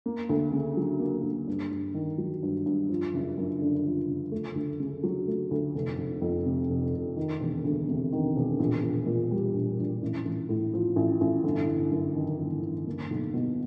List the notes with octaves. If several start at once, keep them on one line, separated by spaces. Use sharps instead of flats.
A#3
D2
C#3
F#3
A#3
D2
G2
G2
D#3
F#3
G2
G2
F3
F#1
F#2
D3
F3
F#1
A3
D2
C#3
F#3
A3
D2
F1
F1
F2
C3
F1
F1
D#3
E1
D2
C3
D#3
E1
A#1
A#1
A#2
G3
A#1
A#1
A1
A1
A2
F3
A1
A1
G1
G1
F#2
D#3
G1
G1
A#3
B1
B2